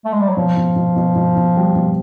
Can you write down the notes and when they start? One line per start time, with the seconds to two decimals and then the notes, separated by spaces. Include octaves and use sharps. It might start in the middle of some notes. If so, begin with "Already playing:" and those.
0.05 A3
0.13 G#3
0.21 G3
0.29 F#3
0.37 B2 F3
0.57 B2
0.76 B2
0.96 B2
1.15 B2
1.36 B2
1.56 G3
1.75 B2